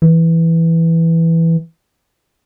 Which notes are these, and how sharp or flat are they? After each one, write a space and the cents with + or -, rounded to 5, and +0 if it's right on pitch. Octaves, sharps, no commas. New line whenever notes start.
E3 +0